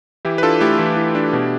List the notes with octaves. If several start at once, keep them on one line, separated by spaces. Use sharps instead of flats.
E3 E4 G4
B4
D4 F4 A4
A3 E4 G4
E3
E3
D4
B2